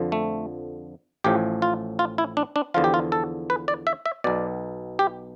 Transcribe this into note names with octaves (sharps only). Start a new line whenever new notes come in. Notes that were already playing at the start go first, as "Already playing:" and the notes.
Already playing: F2 D3 F3
A3
A1 A2 F3 G4
F4
F4
E4
D4
D4
E2 D3 F3 F4
G4
F4
A4
B4
D5
E5
E5
B1 B2 D5
G4